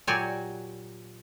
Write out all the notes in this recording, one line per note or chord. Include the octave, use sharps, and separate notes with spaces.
A#2 F#3 F#4 G4 D5 G#5